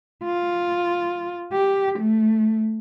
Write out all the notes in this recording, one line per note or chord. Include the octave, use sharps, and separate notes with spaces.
F4
G4
A3